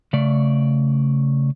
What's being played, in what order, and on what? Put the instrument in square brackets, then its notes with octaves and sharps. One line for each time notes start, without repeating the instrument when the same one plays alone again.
[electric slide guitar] C#3 A3 D5